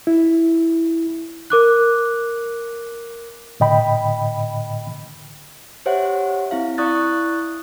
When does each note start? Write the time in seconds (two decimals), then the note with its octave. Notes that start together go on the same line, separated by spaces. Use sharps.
0.07 E4
1.50 A#4 D6 F#6
3.60 A2 D3 D#5 G5 B5
5.86 G4 C5 C#5 E5 F#5
6.51 C4 E4 F5
6.78 E4 D5 C#6 D#6 F#6 A6